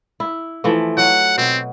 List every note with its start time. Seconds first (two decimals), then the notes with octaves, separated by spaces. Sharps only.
0.20 E4
0.64 E3 F3 A3
0.98 F#3 F#5
1.38 B2 C4